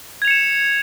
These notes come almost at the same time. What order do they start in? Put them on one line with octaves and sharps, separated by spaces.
G#6 F7 C#7 E7